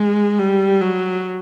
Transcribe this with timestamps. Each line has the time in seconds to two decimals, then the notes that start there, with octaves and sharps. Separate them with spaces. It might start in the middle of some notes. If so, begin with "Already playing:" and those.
Already playing: G#3
0.38 G3
0.81 F#3